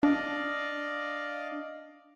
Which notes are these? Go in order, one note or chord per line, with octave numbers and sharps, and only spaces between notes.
D4 D5 D#5 F5